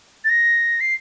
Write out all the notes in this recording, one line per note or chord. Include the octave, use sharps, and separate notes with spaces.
A6
A#6
C7